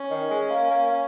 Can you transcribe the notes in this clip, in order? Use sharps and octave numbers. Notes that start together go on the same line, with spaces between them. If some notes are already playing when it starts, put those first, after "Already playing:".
Already playing: C#4
D#3
G#3
A#3
A#3
A#3